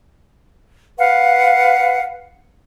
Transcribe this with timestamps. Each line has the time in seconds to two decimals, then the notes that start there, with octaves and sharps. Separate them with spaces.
0.98 B4 F5 F#5